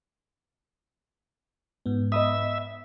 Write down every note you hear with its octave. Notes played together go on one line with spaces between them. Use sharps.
G#2 B3
D#5 E5 B5 D#6